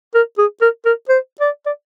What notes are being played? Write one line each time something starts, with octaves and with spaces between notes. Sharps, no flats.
A#4
G#4
A#4
A#4
C5
D5
D5